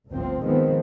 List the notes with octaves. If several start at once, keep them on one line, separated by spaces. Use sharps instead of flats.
G1 D2 A2 F3 C4
D#3 F3 G#3 B3 C4